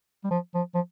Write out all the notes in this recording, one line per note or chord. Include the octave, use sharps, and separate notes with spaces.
G3
F3
F3
F3